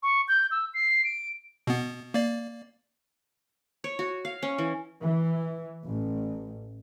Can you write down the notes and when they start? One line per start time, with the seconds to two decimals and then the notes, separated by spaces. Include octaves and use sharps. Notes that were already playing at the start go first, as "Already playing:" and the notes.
0.03 C#6
0.28 G6
0.51 E6
0.74 C7
1.04 D7
1.67 B2 B3
2.14 A#3 D5
3.84 C#5
3.99 F#4
4.25 F5
4.43 C#4
4.58 E3
5.02 E3
5.85 A1